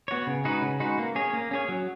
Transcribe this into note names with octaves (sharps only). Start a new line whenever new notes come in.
B3 F#4 C#5
C#3
G#3 D#4 F#4 B4
C#3
G#3 D#4 F#4 B4
A#3
C#4 G#4 C#5
A#3
C#4 G#4 C#5
F#3